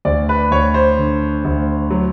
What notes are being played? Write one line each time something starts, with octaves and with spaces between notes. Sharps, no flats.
D2 D5
B4
D2 C#5
C5
D3
D2
F#3